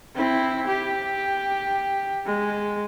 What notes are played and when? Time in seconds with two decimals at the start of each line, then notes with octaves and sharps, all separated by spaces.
0.16 C4 E4
0.68 G4
2.26 G#3